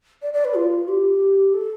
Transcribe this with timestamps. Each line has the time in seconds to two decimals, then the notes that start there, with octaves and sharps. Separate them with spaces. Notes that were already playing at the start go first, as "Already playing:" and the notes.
0.22 D5
0.33 D5
0.44 B4
0.55 F4
0.88 G4
1.53 A4